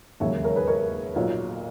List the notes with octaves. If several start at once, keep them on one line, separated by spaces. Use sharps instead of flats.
E1 D#2 C#3 F#3 C#5 E5
A#4 C#5
G#4 B4
A#4 C#5
B1 A#2 F#3